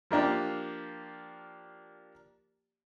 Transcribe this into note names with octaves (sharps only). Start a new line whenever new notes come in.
F3 A#3 D4 G4